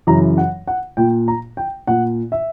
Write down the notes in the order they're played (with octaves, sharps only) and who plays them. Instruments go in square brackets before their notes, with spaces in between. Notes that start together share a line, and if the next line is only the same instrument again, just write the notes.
[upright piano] F#2 C#3 E3 A#5
F#5
F#5
A#2 G5
A#5
G5
A#2 F#5
E5